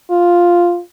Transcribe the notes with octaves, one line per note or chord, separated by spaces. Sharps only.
F4